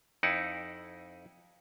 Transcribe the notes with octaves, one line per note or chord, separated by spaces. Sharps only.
F2 D#4 E4 F#5